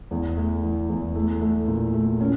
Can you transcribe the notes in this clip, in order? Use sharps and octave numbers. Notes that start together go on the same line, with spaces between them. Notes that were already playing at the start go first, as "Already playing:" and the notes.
E2
A3
E3
E2
A3
A3
A#2
A3
C#4